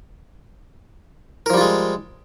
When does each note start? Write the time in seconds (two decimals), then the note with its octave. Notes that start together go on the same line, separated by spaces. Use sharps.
1.46 A#4
1.50 F3
1.54 G3
1.57 F4
1.61 G#3